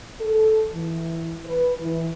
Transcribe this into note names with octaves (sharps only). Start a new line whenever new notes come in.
A4
E3
B4
E3